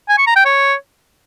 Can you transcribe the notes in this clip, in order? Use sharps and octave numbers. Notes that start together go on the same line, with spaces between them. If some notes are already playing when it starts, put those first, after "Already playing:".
G#5
C#6
A#5
G5
C#5